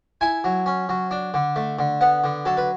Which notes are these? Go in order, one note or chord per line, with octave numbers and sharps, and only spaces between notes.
E4 G#5
F#3
C#4
F#3
D4
D3
A3
D3
B3 F#5
D3
F#3 A4
B4